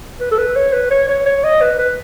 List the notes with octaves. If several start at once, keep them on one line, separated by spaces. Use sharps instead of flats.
B4
A4
B4
C#5
B4
C#5
C#5
C#5
D#5
B4
B4